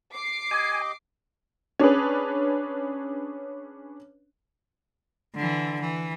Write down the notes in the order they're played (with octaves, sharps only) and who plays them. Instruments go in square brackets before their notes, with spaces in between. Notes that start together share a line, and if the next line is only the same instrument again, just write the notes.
[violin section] D6 C7
[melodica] G4 D#5 [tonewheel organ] G#5
[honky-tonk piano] C#4 D4 G#4 B4
[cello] D3 E3
E3